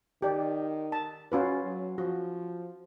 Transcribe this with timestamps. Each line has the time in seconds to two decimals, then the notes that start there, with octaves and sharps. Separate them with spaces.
0.22 D#3 G4 D5
0.92 A5
1.32 C#4 F4 F#4 B4
1.65 F#3
1.98 F3 F#4